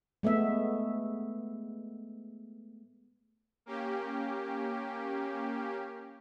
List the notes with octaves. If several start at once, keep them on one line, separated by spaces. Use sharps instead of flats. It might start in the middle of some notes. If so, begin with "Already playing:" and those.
G#3 A3 B3 E5
A#3 C#4 G4